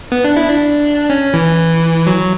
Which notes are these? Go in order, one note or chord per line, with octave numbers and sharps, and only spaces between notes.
B3
D4
E4
D4
C#4
E3
F#3